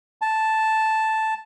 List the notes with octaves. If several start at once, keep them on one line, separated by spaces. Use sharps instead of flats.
A5